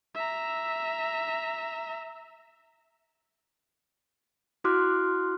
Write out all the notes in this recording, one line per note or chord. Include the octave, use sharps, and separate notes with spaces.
E5 A#5
E4 F#4 C6 D6 F6 F#6